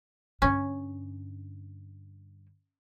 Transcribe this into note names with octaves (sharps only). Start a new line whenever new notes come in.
G2 D3 C#4